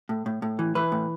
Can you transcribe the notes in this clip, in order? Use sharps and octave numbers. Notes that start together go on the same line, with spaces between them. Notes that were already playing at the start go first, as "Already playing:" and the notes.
A2
A2
A2
E3
E3 B4
A2